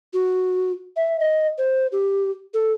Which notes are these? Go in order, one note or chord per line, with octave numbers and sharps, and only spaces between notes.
F#4
E5
D#5
C5
G4
A4